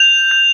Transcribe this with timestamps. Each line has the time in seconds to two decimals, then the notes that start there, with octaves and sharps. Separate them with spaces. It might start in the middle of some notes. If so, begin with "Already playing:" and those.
Already playing: G6 F7
0.31 G6